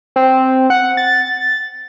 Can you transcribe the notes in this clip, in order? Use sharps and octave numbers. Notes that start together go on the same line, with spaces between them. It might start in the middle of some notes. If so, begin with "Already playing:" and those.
C4
F#5
A6